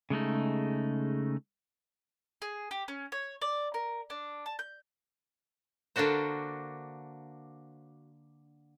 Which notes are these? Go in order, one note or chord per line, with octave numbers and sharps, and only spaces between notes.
C#3 G#3 A3 D#4
G#4
G4
C#4
C#5
D5
A#4
D4
A5
G6
D3 A#3 D4 F#4 C5